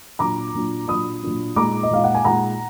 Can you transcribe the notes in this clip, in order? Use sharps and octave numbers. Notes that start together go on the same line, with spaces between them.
A#2 F#3 D4 F4 A#5 D6
A#2 F#3 D4 F4
A#2 F#3 D4 F4 B5 D#6
A#2 F#3 D4 F4
A#2 G#3 D#4 A#5 D6
D#5
A#2 G#3 D#4 F5
F#5
G#5
A#2 G#3 D#4 F#5 A#5